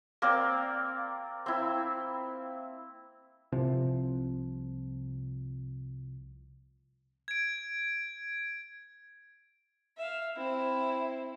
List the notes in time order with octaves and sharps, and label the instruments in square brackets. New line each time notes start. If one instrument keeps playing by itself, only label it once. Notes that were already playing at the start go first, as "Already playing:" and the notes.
[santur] A#3 C4 D5
C4 E4
[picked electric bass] C2 C3 F3
[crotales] G#6 D7
[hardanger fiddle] E5 F5
C4 E4